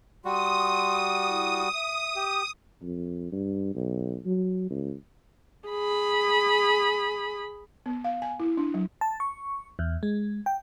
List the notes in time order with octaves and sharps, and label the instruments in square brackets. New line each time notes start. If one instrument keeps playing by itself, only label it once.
[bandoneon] G3 F#4 [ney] C6 [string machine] D#6
[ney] E4
E5
[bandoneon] G4
[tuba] F2
G2
B1
F#3
C#2
[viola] G#4 B5
[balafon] B3
F5
G#5
E4
D4
F#3
[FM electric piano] A5
C#6
E2
G#3
G5